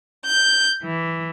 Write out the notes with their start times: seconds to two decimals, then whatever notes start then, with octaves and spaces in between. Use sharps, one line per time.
0.24 G6
0.84 E3